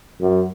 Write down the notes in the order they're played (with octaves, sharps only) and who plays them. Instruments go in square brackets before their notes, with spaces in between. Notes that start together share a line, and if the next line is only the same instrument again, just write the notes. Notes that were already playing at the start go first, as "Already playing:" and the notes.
[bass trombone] F#2